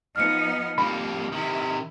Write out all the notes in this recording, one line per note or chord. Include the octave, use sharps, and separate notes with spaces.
F3 B3 D#4 F6 C#7
F2 G3 A#3 B5
C3 D#3 E4